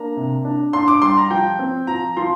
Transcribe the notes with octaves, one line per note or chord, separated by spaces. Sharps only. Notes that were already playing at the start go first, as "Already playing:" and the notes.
Already playing: A#3 D4 A#5
C3
D4
D4 C6
D6
G3 C6
A#5
F3 G5
C4
F3 A#5
F3 C6